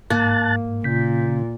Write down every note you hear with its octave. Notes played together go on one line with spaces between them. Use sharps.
G#2 A#3 A5 F#6 A6
A#2 C#3 G6 B6